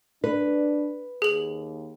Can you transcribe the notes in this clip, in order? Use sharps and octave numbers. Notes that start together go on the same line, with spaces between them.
D4 B4
D#2 G#4 F#7